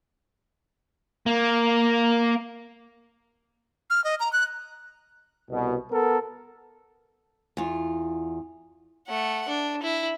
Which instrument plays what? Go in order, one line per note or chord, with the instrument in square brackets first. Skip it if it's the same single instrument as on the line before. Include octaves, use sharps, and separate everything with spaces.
[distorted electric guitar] A#3
[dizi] F6
D#5
A#5
F#6
[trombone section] C2 B2
B3 A4 A#4
[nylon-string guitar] E2 F4
[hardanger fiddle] A3 F#5
D4
E4